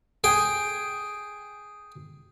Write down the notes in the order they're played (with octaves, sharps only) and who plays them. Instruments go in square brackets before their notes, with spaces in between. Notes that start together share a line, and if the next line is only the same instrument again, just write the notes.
[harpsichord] G#4 G5